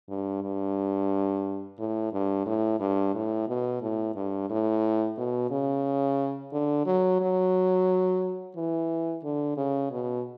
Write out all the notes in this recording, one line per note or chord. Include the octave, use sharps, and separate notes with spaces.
G2
G2
A2
G2
A2
G2
A2
B2
A2
G2
A2
B2
C#3
D3
F#3
F#3
E3
D3
C#3
B2